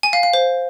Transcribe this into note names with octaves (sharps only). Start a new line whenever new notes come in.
G#5
F5
F5
C5